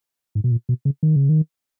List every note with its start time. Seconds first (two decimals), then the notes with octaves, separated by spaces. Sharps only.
0.35 G#2
0.44 B2
0.51 A#2
0.69 B2
0.85 C#3
1.03 D#3
1.16 C#3
1.29 D#3